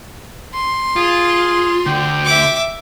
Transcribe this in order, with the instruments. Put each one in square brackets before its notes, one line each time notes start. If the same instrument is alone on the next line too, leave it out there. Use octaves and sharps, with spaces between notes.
[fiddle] C6
[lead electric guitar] F4 [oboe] G#4
[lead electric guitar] D2 D3 [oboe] G5
[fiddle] E5 D6